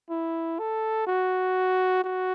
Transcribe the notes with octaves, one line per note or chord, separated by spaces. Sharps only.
E4
A4
F#4
F#4